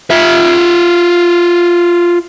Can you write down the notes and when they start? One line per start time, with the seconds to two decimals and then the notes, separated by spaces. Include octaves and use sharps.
0.10 F4 E5